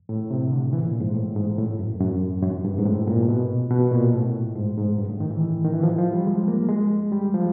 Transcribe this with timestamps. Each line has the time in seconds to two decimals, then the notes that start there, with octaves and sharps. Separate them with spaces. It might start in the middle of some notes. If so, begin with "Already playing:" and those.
0.09 A2
0.31 C3
0.52 D3
0.73 E3
0.86 A#2
1.00 G#2
1.15 A2
1.36 G#2
1.58 A2
1.79 F#2
2.00 F#2
2.43 F#2
2.65 G2
2.79 G#2
2.86 A2
3.08 A#2
3.29 B2
3.71 B2
3.92 A#2
4.13 A2
4.56 G#2
4.78 G#2
4.99 G2
5.09 A2
5.20 D#3
5.30 E3
5.65 D#3
5.74 E3
5.83 F3
5.98 F3
6.13 G3
6.27 G#3
6.48 A#3
6.69 G#3
7.12 G3
7.34 F3